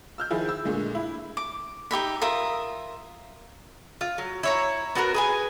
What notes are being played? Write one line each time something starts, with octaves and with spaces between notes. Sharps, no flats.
E6 F6 G6
D#3 F3 E4 G#4
E6
A#2 D3 G#3 A3
E4
D6
D#4 G4 E5 B5
F4 A#4 E5 D#6
F4
F#3
E4 C#5 A#5
B3 F#4 G#4 A#4
G#4 B4 G#5